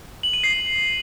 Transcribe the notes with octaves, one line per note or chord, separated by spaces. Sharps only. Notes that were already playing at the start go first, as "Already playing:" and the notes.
F#7
D#7
C7